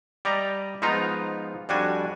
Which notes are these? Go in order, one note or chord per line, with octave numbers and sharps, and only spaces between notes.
G3 G4 D5 D#5 A#5
G#2 F3 B3 D#4 F4 A#5
F2 G3 D4 F#4 G#5